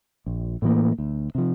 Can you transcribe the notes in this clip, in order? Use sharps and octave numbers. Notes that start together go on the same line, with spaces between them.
A#1
A2 E3 A#3
D2
C3 F3